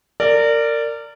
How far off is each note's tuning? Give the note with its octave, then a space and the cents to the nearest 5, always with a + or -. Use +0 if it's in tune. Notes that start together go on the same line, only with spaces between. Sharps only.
A#4 -25 D5 +0